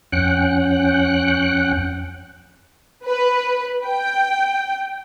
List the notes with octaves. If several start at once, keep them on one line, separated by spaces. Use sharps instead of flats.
F2 C#4 F#5 G5 F#6
B4
G5